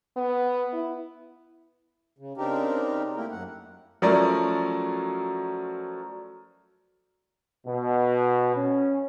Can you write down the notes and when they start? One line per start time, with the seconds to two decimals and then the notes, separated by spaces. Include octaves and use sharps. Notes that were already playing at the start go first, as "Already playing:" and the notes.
0.16 B3
0.73 E4
2.18 C#3
2.37 C#3 C4 D4 D#4 G4 A#4
3.16 A3 A#3 E4 G4 A#4
3.31 F#2 F#5
4.02 F3 F#3 A3 C#4 A#4 D5
7.66 B2
8.55 C#4